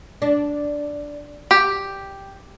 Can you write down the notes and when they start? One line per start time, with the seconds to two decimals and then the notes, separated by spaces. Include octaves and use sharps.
0.22 D4
1.51 G4